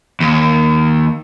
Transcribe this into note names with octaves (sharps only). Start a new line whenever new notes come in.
D#2